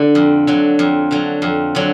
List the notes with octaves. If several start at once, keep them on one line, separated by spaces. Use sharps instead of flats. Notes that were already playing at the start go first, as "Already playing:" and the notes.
Already playing: D3
F2
D3 F#3
F2
D3 F#3
F2
D3 F#3